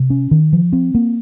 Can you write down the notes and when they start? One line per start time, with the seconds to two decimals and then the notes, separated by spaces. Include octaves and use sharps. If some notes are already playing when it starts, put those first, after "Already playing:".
Already playing: C3
0.10 C#4
0.31 D#3
0.53 F3
0.73 C4
0.95 A#3